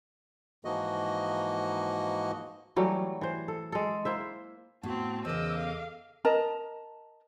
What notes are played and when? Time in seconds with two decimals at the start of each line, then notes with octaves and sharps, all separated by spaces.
0.65 G#2 E3 F3 A#3 F#4 D#5
2.76 E3 F#3 G3 A3
3.21 E3 C5
3.48 A4
3.72 G#3 A4
4.05 A#3 E4 C5 E5
4.83 A2 B3 C4 F#4 A5
5.25 E2 C#3 A#4 C5 D#5 D6 E6
5.58 A4 F5
6.25 A#4 D#5 A5 A#5